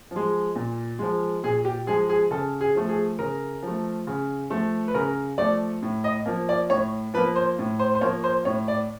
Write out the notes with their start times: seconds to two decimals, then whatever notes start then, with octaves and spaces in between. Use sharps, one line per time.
0.11 F3
0.16 G#3
0.56 A#2
0.99 F3 G#3
1.44 A#2 G#4
1.65 G4
1.87 F3 G#3 G#4
2.09 G#4
2.31 C#3 A4
2.61 G#4
2.75 F3 A3
2.89 G#4
3.19 C#3 A#4
3.63 F3 A3
4.07 C#3
4.50 F3 A3
4.88 B4
4.94 C#3 A#4
5.38 F3 A3 D5
5.82 A2
6.04 D#5
6.26 F3 A#3
6.49 D5
6.70 A2 C#5
7.14 F3 B4
7.17 A#3
7.36 C5
7.59 A2
7.79 C5
7.95 C5
8.01 F3 A#3 C#5
8.24 C5
8.45 A2 C#5
8.68 D5